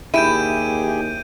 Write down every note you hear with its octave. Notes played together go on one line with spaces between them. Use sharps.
D#2 E4 G4 G#4 G6 D7 D#7